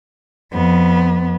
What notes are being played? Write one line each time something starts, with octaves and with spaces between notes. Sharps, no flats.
F2 B3